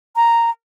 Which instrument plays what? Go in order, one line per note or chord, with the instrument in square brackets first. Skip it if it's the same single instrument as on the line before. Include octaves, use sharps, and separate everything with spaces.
[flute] A#5